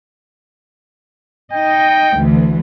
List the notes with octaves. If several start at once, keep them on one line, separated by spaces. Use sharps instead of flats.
D#4 D#5 G5
D2 E3